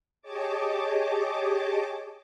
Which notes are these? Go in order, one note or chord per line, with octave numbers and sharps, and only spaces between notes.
G4 G#4 C#5 D#5 A5 D6